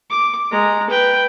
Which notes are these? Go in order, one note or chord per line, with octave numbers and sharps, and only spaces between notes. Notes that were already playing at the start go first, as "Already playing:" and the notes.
D6
G#3 A#5
B4 G5